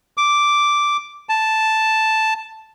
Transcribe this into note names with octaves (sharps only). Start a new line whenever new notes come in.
D6
A5